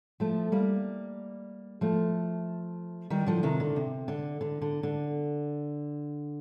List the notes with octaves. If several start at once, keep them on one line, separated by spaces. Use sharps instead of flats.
F3 A3
G3 A#3
F3 A3
D#3 G3
D3 F3
C3 D#3
D3
C3
D3
D3
D3
D3